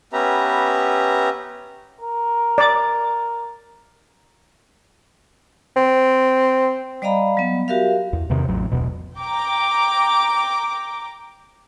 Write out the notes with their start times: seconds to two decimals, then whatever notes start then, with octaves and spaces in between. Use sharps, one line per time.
0.13 B3 C#4 G4 B4 E5 A#5
2.01 A#4
2.58 D5 D6
5.76 C4
7.02 G3 D5 D#5 F5 A#5 B5
7.37 F#3 B3
7.68 F#4 G4 A#4 E5 F5
8.13 E2
8.30 E2 C3 D#3
8.48 A1 F#3
8.72 D1 G1 E2 B2
9.17 G5 A#5 D6